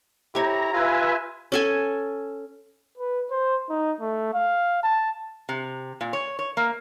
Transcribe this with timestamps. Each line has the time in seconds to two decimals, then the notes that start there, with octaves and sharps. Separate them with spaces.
0.35 E4 G4 C#5 A#5
0.73 F4 B4 E5 G#5
1.52 C#4 A4 G#5
2.98 B4
3.31 C5
3.70 D#4
4.01 A3
4.34 F5
4.83 A5
5.49 C3
6.01 A#2
6.13 C#5
6.39 C#5
6.57 A#3